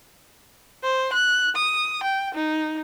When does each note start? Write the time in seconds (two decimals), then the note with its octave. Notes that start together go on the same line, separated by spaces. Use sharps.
0.83 C5
1.13 F#6
1.56 D#6
2.03 G5
2.34 D#4